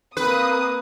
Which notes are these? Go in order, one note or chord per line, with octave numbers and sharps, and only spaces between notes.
A#3 C4 B4 D#6